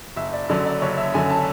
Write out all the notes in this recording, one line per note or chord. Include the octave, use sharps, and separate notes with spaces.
F#1 E5
D5
F#2 D3 F#3 D5
D5
F#1 C#5
E5
F#2 D3 F#3 G#5
A5